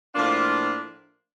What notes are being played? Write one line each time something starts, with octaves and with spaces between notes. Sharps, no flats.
A2 F3 A#3 D4 F4